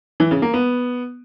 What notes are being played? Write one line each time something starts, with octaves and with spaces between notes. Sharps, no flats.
E3
C#3
A#3
B3